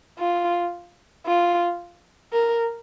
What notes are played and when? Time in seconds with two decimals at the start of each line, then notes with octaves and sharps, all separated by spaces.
0.19 F4
1.27 F4
2.33 A#4